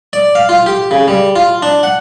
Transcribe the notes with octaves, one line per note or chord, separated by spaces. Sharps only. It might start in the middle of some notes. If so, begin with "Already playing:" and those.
D5
F5
F4
G4
C#3
G3
F4
D4
F#5